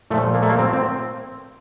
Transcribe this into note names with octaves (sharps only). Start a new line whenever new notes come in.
A#2 F3 A3
A#3
A3
A#3
C4
C4